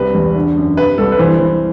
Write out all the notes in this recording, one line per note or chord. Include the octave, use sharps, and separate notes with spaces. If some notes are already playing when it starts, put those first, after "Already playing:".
Already playing: C2 C3 B4
E2
D3
F#2
C3 B4
C2 A4
B4
E3 C5
E3